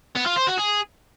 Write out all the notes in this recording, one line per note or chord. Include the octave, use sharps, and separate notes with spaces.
B3
F4
C5
F#4
G#4